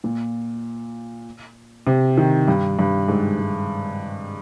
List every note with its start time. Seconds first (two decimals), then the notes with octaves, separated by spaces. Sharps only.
0.04 A#2
1.87 C3
2.17 D#3
2.48 G2
2.79 G2
3.08 G#2
3.39 G#2